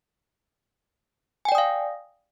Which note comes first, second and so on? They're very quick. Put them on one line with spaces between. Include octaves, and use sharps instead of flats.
G#5 G5 D5 D#6 F5